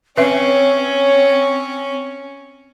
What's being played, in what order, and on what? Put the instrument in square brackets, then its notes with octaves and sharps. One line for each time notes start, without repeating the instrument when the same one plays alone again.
[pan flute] C4 [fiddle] C#4 [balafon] B4 E5 [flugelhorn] C#5